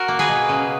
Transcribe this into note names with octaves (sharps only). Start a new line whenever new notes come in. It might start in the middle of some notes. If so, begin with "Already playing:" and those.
Already playing: F#4 A#4
A#3
G#4 B4
B2
C#3